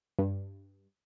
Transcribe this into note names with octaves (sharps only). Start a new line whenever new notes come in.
G2